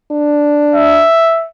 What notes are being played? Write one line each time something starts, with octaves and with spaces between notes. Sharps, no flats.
D4
E5